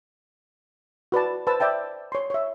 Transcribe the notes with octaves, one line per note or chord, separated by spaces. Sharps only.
F#4 B4 D5 A5
B4 C5 A5 E6
D5 E5 G5 A5
C#5 C6
C#5 E5